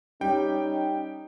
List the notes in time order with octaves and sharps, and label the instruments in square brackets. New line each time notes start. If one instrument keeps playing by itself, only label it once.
[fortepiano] G3 [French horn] C#4 [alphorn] D#4 [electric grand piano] G5